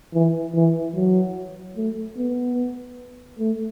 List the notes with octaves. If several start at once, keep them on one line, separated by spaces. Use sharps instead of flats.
E3
E3
F#3
A3
B3
A3